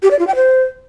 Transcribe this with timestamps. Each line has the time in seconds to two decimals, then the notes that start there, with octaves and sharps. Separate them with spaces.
0.03 G4
0.11 D5
0.19 F4
0.27 G5
0.35 C5